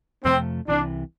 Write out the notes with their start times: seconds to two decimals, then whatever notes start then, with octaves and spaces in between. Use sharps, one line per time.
0.24 F2 C3 F3 A3 C4
0.68 C2 C3 E3 D4